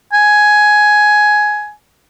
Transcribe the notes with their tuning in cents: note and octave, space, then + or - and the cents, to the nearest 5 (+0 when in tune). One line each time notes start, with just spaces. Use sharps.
G#5 +10